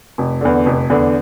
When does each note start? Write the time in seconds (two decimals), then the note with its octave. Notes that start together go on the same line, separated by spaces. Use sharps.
0.18 F1
0.41 E2 D3
0.66 F1
0.90 E2 D3